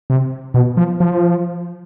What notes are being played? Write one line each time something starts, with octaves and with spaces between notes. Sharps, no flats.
C3
B2
F3
F3